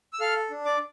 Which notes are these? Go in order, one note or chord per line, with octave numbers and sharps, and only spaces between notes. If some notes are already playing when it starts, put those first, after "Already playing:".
E6
A4 F5 F6
D4
D5 D6